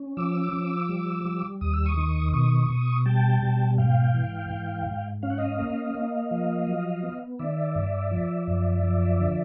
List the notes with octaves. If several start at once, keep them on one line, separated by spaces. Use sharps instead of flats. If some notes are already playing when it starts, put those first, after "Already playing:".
Already playing: C#4
F3 D6 E6
F3
G3
G3
D#2 D#6
E6
C#6 D#6
D#3
B2 C#6 D#6
B2
G3 G5 A5
B2
G#2 F5 G5
E3
G#2
G#2
C#4 F5
F#5
D#5 F5
A#3
A#3
F3
F#3
B3
D#3 D5 E5
G2
F3
F#2
F3
D3